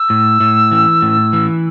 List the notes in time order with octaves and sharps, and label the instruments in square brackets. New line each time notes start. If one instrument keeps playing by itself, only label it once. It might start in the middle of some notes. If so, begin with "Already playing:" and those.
Already playing: [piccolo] E6
[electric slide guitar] A2
A2
E3
A2
E3